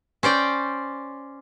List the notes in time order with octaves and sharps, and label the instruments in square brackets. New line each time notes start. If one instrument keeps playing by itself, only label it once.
[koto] C#4 C5 D5 G5